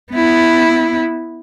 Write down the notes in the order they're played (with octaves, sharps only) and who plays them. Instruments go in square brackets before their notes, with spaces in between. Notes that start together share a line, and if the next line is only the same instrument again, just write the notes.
[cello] B3 E4